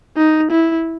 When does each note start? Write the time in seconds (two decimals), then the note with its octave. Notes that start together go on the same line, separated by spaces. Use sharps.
0.17 D#4
0.51 E4